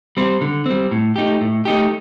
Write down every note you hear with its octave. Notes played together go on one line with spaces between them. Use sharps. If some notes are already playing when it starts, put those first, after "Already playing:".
G3 C4
D3
G3 C4
A2
A3 D#4 G4
A2
A3 D#4 G4